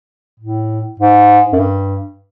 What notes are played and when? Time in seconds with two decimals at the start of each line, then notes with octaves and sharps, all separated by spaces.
0.40 A2
1.00 G#2
1.53 F#2
1.59 G2